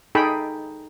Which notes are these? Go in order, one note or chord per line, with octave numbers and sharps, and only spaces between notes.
D#4 G#4 A4 G5 B5